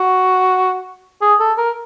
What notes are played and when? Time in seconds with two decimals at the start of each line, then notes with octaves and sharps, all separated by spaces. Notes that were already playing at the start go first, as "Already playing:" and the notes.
Already playing: F#4
1.22 G#4
1.40 A4
1.58 A#4